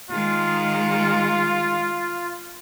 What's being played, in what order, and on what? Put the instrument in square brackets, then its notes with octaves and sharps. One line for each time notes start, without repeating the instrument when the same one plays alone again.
[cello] D#3 G#3 [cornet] F4